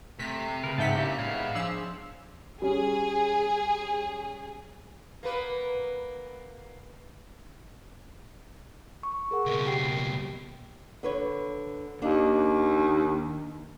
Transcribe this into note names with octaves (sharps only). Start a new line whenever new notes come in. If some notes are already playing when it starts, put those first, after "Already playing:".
C3 A3 B6
C#3 A#4 B4
G#2 E5 F#5 G5 A5 B6
A#2 C#4 E4 G4
A2 G#3 B3 C#5 F5
F3 D4 G#4 C5 E6
G3 C#4 G#4
A#3 B3 B4
C#6
G#4 A#4 F#5
C#2 B2
G4 G5 C7
D3 B4 C#5
D#2 D#3 D4 F4